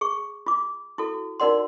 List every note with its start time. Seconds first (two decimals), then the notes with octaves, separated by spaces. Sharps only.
0.01 G#4 C#6
0.46 F4 D6
0.98 E4 F#4 A4
1.40 D#4 F#4 A#4 D5 F#5 C6